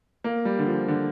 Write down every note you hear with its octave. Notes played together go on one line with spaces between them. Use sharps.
A#3
G3
D3
F3
D3